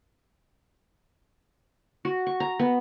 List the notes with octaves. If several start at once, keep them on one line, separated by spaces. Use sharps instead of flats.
F#4
C#6
A#5
B3